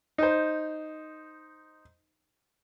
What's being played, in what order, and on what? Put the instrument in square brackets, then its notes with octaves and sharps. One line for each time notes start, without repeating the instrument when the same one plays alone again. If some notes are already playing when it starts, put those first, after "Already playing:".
[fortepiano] D#4 C5